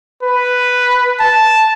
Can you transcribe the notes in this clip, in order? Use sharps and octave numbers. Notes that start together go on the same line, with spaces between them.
B4
A5